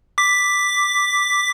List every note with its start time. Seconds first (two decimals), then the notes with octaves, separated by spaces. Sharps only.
0.18 D6 B6